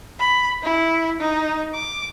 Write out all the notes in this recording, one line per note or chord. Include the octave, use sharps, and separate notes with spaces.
B5
E4
D#4
D6